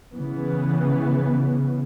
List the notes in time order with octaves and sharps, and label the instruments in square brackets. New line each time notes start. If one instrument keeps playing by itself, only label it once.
[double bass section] C#3 E3 B3